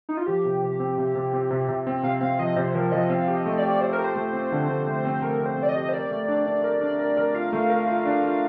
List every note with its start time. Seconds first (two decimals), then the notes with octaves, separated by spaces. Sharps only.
0.09 D#4
0.17 F4
0.26 F3 G4
0.45 C3
0.62 C3
0.80 C4
0.98 C3
1.15 C3
1.33 C4
1.51 C3
1.69 C3
1.87 C4
2.03 C3 F5
2.21 C4 F5
2.39 F3 D#5
2.56 C3 C5
2.75 F3 A#4
2.92 F3 D#5
3.10 C4 F5
3.28 G4
3.34 D#5
3.46 A3
3.58 G4 D5
3.81 G4 C5
3.93 A#4
3.99 G4
4.04 C5
4.16 A3
4.33 C4
4.52 D3
4.69 D3
4.87 A3
5.05 C4
5.22 A3 A#4
5.40 C4
5.46 C5
5.58 C4
5.63 D5
5.69 D#5
5.75 G4
5.89 C5
5.94 A#4 D5
6.10 A3
6.28 D4
6.47 D4
6.64 A#4
6.81 D4
6.99 A#4
7.17 A#4
7.35 F4 F5
7.53 A3
7.70 A#4
7.87 F4
8.05 D4
8.23 F4